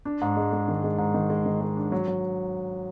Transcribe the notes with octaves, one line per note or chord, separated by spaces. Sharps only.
D4
G#2
G#3
G#3
D#3
G#3
G#2
D#3
G#3
D#3
G#3
D4
F#3
F#3